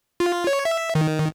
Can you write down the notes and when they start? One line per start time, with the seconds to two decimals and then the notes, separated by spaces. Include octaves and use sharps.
0.20 F4
0.47 C#5
0.65 E5
0.95 D#3